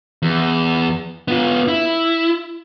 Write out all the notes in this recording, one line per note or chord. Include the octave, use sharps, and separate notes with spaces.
E2
B3 F4
E4